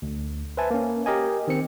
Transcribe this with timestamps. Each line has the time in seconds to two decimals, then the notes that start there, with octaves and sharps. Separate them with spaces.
0.02 D2
0.57 B4 C5 E5 G#5 A5
0.71 A#3 C#4
1.06 G4 A#4 D#5 G#5
1.48 D#3 C4 C#7